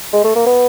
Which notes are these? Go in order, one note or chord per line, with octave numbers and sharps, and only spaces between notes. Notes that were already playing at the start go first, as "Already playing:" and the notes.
G#3
A3
A#3
B3